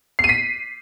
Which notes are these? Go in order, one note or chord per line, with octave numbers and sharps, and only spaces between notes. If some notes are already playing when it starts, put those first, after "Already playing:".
C7
D#7
B6